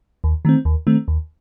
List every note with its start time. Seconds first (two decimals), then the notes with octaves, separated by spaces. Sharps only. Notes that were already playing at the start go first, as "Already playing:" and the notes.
0.24 D#2
0.45 D#3 A3 C4
0.65 D#2
0.87 D#3 A3 C4
1.08 D#2